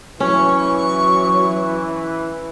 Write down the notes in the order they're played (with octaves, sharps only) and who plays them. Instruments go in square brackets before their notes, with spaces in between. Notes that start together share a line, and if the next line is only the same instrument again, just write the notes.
[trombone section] E3 [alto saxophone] F#3 [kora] C#4 [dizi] C#6